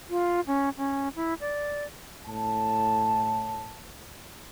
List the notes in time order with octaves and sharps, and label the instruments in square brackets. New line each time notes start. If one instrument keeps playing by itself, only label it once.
[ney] F4
C#4
C#4
E4
D5
[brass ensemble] A2 A5